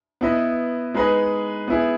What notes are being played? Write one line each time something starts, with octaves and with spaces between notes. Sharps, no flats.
B3 E4 B4 D#5
G#3 D#4 G#4 B4 D#5
B3 E4 G#4